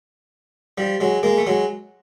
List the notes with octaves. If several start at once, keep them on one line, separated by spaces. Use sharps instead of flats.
F3 G3
F#3 G#3
G#3 A#3
A3
F#3 G#3